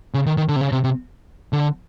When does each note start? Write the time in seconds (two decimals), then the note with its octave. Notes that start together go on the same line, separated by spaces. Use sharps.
0.14 C#3
0.26 D#3
0.37 D#3
0.49 D3
0.56 C3
0.61 C#3
0.72 C3
0.84 C3
1.53 D3